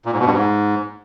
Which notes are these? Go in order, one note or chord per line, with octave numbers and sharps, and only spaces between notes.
A#2
G#2
B2
G2
G#2